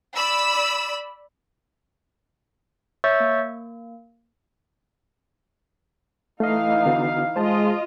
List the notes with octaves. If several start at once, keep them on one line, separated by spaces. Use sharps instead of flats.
D5 B5 E6
C#5 E5 C#6 E6 G6 A6
A#3
E3 A3 D#4 D#5 F5
D3 B3 F#4
G#3 F4 C5 D#5 A5